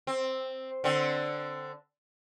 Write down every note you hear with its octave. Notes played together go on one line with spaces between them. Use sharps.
C4
D3 C4